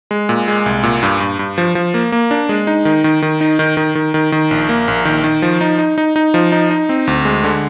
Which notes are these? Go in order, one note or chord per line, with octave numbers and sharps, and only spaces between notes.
G#3
A#2
G#3
C2
A#2
G2
G2
G2
F3
F3
A#3
A#3
D4
G#3
D#4
D#3
D#3
D#3
D#4
D#3
D#3
D#3
D#3
D#3
A#1
A#3
A#1
D#3
D#3
F3
D#4
D#4
D#4
D#4
F3
D#4
D#4
C4
D2
G#3
D3